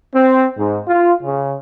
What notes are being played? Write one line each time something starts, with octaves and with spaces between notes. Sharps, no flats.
C4
G#2
F4
C#3